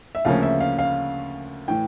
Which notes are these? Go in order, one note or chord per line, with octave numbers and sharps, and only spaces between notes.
E5
D2 C#3 F3 A#3 C#4 F5
E5
F5
F5
A2 E3 G5